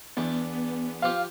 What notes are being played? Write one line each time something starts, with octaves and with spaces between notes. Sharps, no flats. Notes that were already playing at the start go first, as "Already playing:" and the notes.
E2 B3 D4
F3 F4 G4 F5 F6